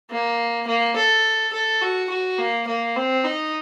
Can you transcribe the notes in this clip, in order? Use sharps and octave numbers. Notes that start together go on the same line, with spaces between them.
A#3
A#3
A4
A4
F#4
F#4
A#3
A#3
C4
D#4